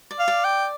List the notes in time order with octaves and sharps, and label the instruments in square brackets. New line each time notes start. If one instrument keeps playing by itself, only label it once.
[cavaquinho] D5
[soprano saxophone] F5
[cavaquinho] D5
[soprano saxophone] G5